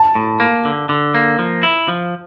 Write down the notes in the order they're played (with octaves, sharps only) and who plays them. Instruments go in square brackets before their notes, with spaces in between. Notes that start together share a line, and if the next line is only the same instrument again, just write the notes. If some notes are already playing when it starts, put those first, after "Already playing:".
Already playing: [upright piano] A5
[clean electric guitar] A2
A#3
D3
D3
A#3
F3
E4
F3